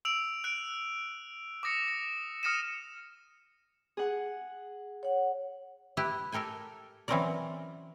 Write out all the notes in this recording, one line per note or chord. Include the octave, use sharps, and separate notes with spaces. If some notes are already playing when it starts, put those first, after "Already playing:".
E6 D7 F7
F#6 D7
D6 D#6 A#6 C#7
A#6
D#6 F6 A#6 C#7 D#7 E7
G#4 F#5
C#5 F#5
E4 G4 B4
G4 A4 A#4 G5 G#5
E3 F#3 C4 C#4 A#4 D5